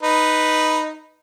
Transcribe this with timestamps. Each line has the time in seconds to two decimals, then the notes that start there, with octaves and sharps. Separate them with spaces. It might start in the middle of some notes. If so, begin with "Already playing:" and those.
0.03 D#4 B4